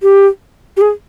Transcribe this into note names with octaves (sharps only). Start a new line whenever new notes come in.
G4
G4
G#4